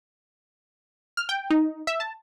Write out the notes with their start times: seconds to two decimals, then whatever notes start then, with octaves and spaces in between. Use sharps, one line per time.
1.17 F6
1.29 G5
1.50 D#4
1.87 E5
2.00 A5